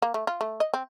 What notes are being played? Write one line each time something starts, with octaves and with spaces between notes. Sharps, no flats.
A#3
A3
F4
A3
D#5
C4